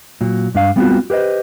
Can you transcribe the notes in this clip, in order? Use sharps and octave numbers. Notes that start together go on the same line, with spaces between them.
A#2 F#3
G2 D4 F5
G3 B3 C4 D#4 F4 F#4
G4 B4 C5 D#5